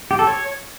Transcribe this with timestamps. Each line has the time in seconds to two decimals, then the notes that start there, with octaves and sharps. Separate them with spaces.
0.11 G4
0.19 A4
0.27 C#5